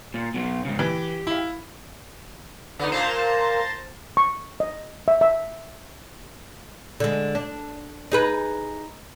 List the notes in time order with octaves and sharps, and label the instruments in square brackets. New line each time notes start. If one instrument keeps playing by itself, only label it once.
[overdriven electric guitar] A#2
B2 F#3
G#2 C#3
[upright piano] E3 [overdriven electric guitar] G4
[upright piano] E4 F5
[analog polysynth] D3 D#4 [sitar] B3
[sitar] A#2 A#3 [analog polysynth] C5 A5 A#5
[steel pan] C#6
D#5
E5
E5
[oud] D3 G#3
D4
D#4 G#4 B4